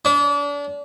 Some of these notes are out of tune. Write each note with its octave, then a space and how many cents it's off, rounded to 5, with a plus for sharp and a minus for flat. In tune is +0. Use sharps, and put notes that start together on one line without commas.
D4 -35